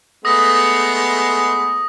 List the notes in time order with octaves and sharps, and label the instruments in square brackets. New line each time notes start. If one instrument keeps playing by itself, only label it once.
[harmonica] G#3 A3 B3 [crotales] D#6 A#6